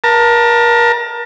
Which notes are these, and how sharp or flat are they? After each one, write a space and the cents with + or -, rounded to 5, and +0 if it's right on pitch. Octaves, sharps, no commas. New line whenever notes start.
A#4 +30 A5 +35